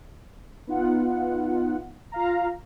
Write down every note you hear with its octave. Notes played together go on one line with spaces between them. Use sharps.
B3 D#4 F4 F#5
F4 F5 A#5